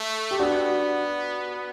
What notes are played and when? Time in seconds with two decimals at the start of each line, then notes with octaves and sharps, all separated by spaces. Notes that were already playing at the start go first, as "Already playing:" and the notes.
Already playing: A3
0.31 G4
0.39 B3 D4 F#4